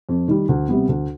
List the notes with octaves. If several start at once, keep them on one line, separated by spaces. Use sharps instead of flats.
F2
D#3 G3
D2
C3 G3 B3
D2